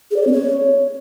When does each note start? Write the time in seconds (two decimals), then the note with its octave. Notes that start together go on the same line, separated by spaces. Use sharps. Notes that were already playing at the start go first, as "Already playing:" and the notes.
0.11 G#4
0.16 D5
0.22 C#5
0.27 C4
0.32 C#5